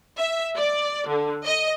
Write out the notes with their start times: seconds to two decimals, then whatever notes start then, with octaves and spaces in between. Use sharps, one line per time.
0.17 E5
0.57 D5
1.08 D3
1.44 D#5